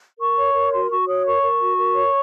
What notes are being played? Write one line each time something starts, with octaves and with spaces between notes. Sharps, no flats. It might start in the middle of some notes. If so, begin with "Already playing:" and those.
A#4 C#6
C#5
A#4
F#4 C6
F#4 C#6
C#5 D#6
A#4 C#6
A#4
F#4
A#4
C#5